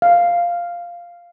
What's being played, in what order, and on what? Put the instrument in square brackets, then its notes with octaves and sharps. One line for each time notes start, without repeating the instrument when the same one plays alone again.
[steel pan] F5